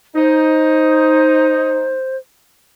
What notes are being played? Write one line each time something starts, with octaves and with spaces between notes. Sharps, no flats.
D#4 C5